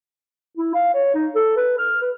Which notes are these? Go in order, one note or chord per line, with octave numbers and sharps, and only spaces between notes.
E4
F5
C#5
D#4
A4
B4
F6
B4